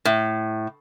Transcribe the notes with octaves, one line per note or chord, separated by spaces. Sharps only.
A2